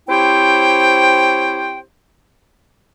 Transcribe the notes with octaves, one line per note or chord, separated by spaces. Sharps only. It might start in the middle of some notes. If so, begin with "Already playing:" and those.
C4 E4 G4 C5 C#5 G5